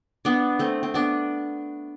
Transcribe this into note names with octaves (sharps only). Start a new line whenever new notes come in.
B3 D4
A3 C4
C4
B3 D4